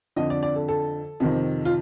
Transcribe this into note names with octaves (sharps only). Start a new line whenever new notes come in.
F2 D3 D#5
D5
D5
A4
A4
F2 C3 D#3
F4